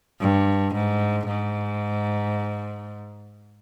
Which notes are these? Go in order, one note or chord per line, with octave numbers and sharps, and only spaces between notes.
G2
G#2
G#2